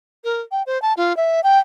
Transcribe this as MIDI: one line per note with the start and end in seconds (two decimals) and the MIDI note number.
0.24 0.41 70
0.51 0.63 79
0.66 0.81 72
0.82 0.93 81
0.97 1.15 65
1.17 1.41 76
1.43 1.58 79